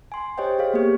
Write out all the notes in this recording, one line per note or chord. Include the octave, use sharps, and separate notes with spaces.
G#5 C6
G4 C5 C#5 D#5 G5
G#4 C#5 F5
A#3 B3 G4